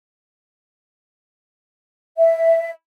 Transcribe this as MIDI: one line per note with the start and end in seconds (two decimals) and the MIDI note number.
2.18 2.69 76